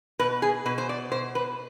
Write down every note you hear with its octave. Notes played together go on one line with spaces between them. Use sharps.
B2 B4
G#4
B2 B4
C5
D5
B2 C5
B4